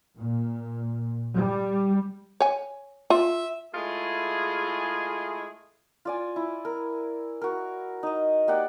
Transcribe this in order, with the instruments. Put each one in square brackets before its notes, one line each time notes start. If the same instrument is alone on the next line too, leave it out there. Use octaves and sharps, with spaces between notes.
[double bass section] A#2
G3
[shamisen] C#5 G#5
[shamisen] F4 [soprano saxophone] E5
[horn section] G#3 A3 E4 F4 G#4
[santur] F4 D5 G#5
E4
A#4
F#4 A#4
D#4 D#5
A#3 G4 D5 F#5